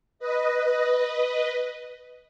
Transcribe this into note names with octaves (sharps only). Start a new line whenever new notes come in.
B4 D#5